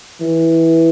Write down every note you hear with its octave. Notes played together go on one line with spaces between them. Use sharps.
E3